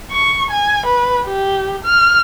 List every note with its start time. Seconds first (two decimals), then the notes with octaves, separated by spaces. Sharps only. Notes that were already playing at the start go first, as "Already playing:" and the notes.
0.12 C#6
0.50 G#5
0.86 B4
1.26 G4
1.84 F6